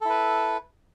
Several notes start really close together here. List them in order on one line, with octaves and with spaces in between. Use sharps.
A4 E4 B4